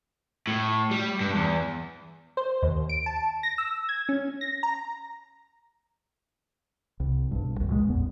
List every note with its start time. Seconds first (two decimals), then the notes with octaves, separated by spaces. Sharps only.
0.47 A2
0.91 G3
1.21 G2
1.35 E2
2.37 C5
2.63 D#2
2.89 D7
3.06 A5
3.43 A#6
3.58 E6
3.89 G#6
4.09 C#4
4.41 A#6
4.63 A#5
7.00 C2
7.31 B1 G2
7.56 G#1 D#2
7.69 C#2 A#2 D#3 G#3
7.90 A1 E2 B3